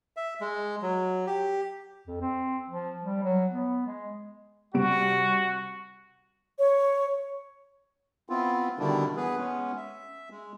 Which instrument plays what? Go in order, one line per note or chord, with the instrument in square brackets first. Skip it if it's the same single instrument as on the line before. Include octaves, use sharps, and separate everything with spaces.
[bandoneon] E5
G#3
F#3
G4
[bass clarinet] F2
C4
F3
G3
F#3
B3
G#3
[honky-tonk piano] C3 G3 D7 [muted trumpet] F#4
[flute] C#5
[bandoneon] B3 C4 E4 F4
B2 D3 D#3 G3 D4 E4
E3 B3 G#4 B4
G#3 B3 C#4
E5
G#3